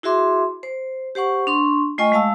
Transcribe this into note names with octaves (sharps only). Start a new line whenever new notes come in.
E4 F#4 G#4 E5 C6 D6
C5
G4 C5 F#5 C#6
D4 C6 C#6
A3 F4 D#5 G5 G#5 C#6
G#3 F5 A5 E6